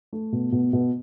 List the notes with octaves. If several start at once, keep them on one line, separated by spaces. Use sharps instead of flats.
A3
B2
B2
B2